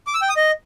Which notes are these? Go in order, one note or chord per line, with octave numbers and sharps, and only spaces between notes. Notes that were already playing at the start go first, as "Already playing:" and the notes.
D6
E6
G5
D#6
D#5